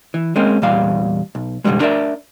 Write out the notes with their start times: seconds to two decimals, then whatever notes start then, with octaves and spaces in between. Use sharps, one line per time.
0.14 E3
0.36 G#3 A#3 C4 C#4
0.62 E2 A#2 G3 F5
1.35 B1
1.64 F#2 B2 D3 D#3 G3 G#3
1.81 D4 A#4 D5 E5